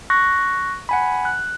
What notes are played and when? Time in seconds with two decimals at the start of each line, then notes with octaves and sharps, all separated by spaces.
0.10 C#6 F#6 A#6
0.89 F#5 G#5 B5
1.25 F#6